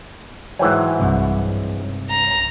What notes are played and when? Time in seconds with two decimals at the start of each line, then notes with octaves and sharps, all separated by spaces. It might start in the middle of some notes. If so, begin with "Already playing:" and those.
0.59 G#2 E3 F#3 C5 G5 G#5
0.99 B1 G2 C3
2.10 A#5